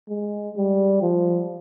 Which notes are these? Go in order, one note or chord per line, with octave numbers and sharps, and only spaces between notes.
G#3
G3
F3